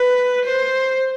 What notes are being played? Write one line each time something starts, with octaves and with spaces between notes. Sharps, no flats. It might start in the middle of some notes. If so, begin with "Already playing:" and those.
Already playing: B4
C5